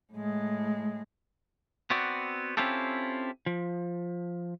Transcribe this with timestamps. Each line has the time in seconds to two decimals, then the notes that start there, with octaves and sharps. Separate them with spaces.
0.13 A2 G#3
1.90 B3 C4 F#4 D5
2.57 C4 C#4 E4 F4 G4 A4
3.46 F3